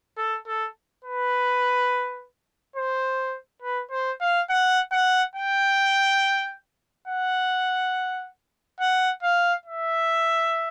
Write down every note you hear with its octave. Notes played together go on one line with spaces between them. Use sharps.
A4
A4
B4
C5
B4
C5
F5
F#5
F#5
G5
F#5
F#5
F5
E5